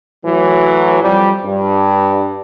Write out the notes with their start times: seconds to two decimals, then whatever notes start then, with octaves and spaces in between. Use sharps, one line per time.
0.24 A2 E3 F#3
1.02 F2 G3
1.45 G2